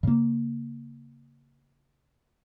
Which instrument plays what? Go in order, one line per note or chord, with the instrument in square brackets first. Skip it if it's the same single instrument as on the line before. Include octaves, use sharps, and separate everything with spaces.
[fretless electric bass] C#3 A#3